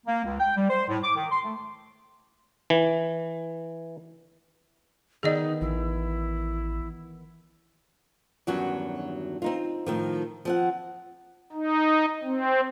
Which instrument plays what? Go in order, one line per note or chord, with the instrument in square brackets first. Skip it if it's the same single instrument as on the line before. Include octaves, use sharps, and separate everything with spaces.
[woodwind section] A#3
C#2
G5
G3
C5
A2
D6
D#3
C6
A3
[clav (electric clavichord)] E3
[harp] D#3 B3 [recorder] D#4 [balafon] G#4 D5 D#5
[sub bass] A1 [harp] E3 [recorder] E4
[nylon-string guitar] E2 G2 D#3 F#3 C#4 F#4
C4 D#4 F4
A2 D#3 F3
F3 C4 F#5
[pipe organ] D#4
C4